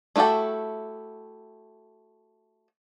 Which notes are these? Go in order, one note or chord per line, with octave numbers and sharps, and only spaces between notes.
A3 E4 F#4 G4 A4